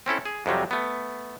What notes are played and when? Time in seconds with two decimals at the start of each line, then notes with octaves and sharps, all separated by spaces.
0.06 C4 C#4 E4 A4
0.25 G#4
0.46 F2 C3 F#3 G3
0.71 A3 B3